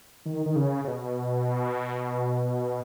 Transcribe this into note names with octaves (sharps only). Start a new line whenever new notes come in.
D#3
D#3
C#3
C#3
B2